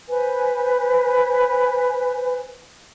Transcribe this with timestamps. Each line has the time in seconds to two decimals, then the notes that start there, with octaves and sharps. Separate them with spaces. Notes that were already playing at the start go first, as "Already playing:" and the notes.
0.08 B4 C5 G#5